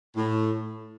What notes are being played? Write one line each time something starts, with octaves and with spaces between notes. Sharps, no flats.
A2